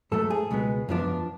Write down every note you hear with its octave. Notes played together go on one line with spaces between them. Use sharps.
G#2 F#3 A3 A4
G#4
C#2 B2 G#3 B3
F#2 F3 B3 D4